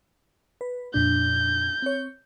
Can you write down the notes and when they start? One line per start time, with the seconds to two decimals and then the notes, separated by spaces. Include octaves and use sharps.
0.61 B4
0.94 F2 A#2 D4 G6
1.82 C4 C#5